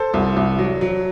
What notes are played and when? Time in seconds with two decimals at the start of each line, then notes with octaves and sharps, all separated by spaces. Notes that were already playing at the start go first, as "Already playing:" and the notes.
Already playing: A4 C5
0.14 C2
0.37 C2
0.59 F#3
0.81 F#3